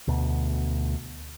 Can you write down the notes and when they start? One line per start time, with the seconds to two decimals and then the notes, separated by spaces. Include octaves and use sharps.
0.08 D2 B2